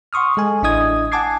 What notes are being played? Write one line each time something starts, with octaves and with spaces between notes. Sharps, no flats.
F#5 C6 C#6 D#6 F6
G#3 A4 G#5
A1 D4 E4 D#5 D#6 G#6
F#5 G#5 A5 D6 G#6 C7